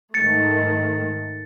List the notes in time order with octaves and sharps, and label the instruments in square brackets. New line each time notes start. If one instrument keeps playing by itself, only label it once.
[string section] G#2 D#3 A3 [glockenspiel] A6 C#7